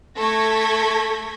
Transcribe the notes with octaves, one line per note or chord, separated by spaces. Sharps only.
A3 A4 C#6 G#6 A#6 B6